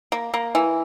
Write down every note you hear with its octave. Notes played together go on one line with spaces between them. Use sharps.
A#3
A#3
E3